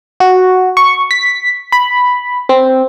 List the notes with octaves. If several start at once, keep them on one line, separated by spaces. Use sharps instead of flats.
F#4
C#6
B6
B5
C4